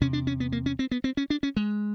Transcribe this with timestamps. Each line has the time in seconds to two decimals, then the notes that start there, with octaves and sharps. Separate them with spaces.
0.01 E2 C3 C#4
0.13 D4
0.27 C#4
0.40 B3
0.52 A#3
0.66 C#4
0.79 C4
0.91 B3
1.04 C4
1.17 C#4
1.30 D4
1.43 C#4
1.57 G#3